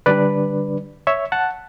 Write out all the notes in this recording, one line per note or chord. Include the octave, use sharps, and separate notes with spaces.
D3 G3 D4 B4 D5
C#5 E5
F#5 A5